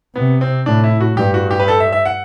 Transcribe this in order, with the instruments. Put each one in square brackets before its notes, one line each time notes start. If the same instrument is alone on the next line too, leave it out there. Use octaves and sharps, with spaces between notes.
[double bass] C3 [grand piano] B3
[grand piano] C4
[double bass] A2 [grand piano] D4
[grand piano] E4
F#4
[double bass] G2 [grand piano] G4
[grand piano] F#4
G4
B4
A4
E5
E5
F#5